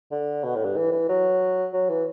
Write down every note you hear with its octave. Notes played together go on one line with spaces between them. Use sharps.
D3
B2
A2
G2
E3
E3
F#3
F#3
E3